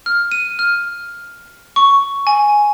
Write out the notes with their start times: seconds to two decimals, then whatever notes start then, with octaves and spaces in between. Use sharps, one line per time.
0.06 F6
0.32 D#7
0.59 F6
1.76 C#6
2.27 G#5